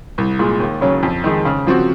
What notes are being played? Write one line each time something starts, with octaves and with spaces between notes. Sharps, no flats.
C2
A#2 G#3
D#2
C#3 F#3 C#4
F2
D#3 G#3 D#4
C#3
F3 C4 F#4